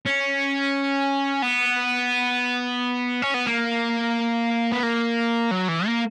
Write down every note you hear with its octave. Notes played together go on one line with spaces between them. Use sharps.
C#4
B3
C#4
B3
A#3
B3
A#3
F#3
E3
A#3